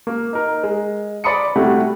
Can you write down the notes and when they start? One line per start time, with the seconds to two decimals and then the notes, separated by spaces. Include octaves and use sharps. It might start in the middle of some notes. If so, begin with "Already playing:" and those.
0.07 A#3
0.33 D#4 A#4
0.63 G#3
1.24 D5 B5 C6 D#6 C#7
1.56 C3 G3 A3 E4 F#4